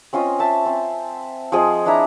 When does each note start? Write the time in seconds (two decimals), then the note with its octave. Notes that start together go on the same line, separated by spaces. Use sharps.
0.13 C4 C#4 F4 D#5
0.39 E5 A5
0.66 C4
1.52 F3 C4 G#4 D#5
1.86 D4 E4 E5 A#5